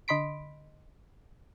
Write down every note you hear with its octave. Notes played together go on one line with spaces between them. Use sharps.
D3 D#5 B5 C6 B6 D7